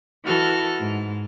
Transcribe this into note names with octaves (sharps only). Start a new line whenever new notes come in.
E3 F#4 A4 F6
G#2